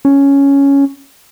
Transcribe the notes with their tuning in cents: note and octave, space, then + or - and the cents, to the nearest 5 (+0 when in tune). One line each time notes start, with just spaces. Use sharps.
C#4 +5